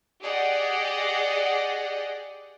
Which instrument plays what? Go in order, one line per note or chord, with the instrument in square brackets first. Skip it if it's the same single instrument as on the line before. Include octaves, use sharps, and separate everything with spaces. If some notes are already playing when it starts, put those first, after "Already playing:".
[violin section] G4 G#4 D5 D#5 F#5